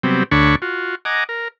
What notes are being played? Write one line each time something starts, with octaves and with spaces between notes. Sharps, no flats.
C3 F#3 G3 B3 C4
D2 D3 D4 C#5 B5 C#6
F4 F#4
D#5 F#5 G#5 A#5 D6
A#4